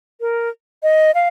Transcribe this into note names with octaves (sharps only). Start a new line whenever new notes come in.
A#4
D#5
F5